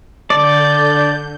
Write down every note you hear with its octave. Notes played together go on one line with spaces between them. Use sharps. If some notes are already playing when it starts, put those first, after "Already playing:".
D3 D5 A5 G6